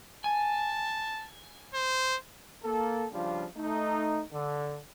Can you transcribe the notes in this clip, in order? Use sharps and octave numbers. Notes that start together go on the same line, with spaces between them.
G#5 A5
C5
A#3 A4
C#3 F3 G3 D4 F4
A3 D#4
D3